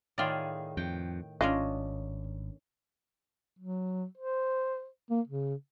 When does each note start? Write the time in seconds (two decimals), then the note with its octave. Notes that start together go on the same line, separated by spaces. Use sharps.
0.18 A2 D#3 F4 G#4 D5
0.77 F2 G5
1.41 G#1 C#4 D4 F4 D#5
3.59 F#3
4.18 C5
5.11 A#3
5.28 C#3